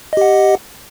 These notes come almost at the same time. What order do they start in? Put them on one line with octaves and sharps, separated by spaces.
D#5 G4 F#5